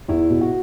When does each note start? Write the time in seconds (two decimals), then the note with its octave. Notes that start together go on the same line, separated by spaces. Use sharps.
0.08 E2 E4
0.30 B2
0.41 F#4